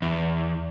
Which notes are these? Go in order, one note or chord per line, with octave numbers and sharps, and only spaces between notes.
E2